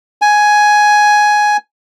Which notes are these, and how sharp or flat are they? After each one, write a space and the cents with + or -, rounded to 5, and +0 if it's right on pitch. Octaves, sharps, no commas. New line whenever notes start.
G#5 +10